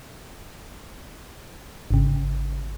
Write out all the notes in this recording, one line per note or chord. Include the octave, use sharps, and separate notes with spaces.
G#1 C#3